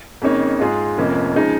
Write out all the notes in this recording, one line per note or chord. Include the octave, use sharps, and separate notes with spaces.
F2 C#3 A#3 D#4 C#5
G#2 G#3 F4 G#4
F1 F2 F3 A#3 C#4
C#3 F3 G#3 D#4